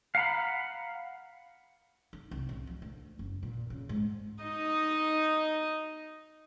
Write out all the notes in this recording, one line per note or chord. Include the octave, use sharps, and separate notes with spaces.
F5 F#5 A#5 B5
D#4
C2
A1
F3
D2
F#1
A#2
C#3
G#2
D#4 D#5